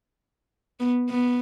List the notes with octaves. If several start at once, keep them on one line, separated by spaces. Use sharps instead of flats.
B3
B3